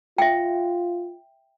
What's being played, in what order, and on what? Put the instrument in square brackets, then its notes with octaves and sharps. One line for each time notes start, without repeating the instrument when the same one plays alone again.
[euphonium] F4 [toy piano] E5 G5